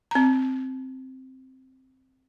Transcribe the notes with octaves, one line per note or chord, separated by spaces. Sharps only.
C4 A#5